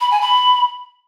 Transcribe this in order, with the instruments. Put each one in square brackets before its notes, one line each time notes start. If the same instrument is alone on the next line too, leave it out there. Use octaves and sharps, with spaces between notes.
[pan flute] B5
G#5
B5